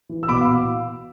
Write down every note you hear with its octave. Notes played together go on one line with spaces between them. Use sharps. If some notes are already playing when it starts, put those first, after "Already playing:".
E3
E6
B2 B5 D6
F5
B2